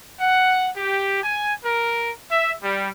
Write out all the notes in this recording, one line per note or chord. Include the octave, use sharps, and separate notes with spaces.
F#5
G4
G#5
A#4
E5
G3